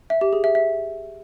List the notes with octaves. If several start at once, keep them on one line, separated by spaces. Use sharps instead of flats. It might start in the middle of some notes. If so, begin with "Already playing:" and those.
E5
G4
G#4
E5
E5